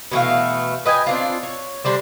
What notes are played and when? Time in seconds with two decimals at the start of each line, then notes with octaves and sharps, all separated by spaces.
0.12 B2 E3 A3 F5
0.86 B4 D#5 G5 G#5
1.06 C4 D4 F4
1.43 C#5
1.84 D3 G3 D4 C5